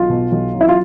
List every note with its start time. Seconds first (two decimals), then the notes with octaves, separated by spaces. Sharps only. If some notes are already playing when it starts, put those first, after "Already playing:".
Already playing: B1 F4
0.09 B2
0.32 B1
0.54 F#3
0.61 E4
0.69 F4